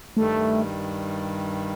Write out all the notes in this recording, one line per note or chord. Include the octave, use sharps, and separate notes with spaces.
G2 D#3 G3 A3